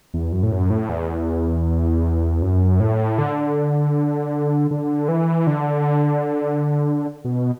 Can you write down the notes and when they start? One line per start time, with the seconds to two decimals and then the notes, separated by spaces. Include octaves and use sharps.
0.14 E2
0.32 F#2
0.43 A2
0.52 F#2
0.70 A2
0.89 E2
2.42 F#2
2.80 A2
3.18 D3
4.71 D3
5.09 E3
5.47 D3
7.25 B2